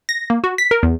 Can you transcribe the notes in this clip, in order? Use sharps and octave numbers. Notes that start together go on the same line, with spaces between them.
A#6
A#3
F#4
B6
A#4
E2